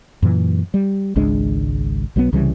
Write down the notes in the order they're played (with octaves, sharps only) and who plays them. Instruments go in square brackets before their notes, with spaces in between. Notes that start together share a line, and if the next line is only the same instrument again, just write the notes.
[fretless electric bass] F#2 A#2 E3
G3
G#1 C#2 G#3 D4
B1 F#3 G3 B3
C2 C#3 E3 G3